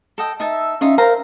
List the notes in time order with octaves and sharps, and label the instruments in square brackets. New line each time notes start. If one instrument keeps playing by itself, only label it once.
[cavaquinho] A4 D#5 G5
D#4 E5 A5
[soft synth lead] E6
[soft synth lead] C#4 [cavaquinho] D#4 F4 E5
[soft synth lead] A#4 [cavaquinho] C5 F5 A#5